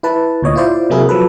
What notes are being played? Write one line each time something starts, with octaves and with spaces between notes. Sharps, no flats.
E4 B4 A5
D2 A#2 C#5 D#5
E4 F4 C5 D5
C3 F#3 A#3 E4 G#4 A#4
F3 F#3 A4 B4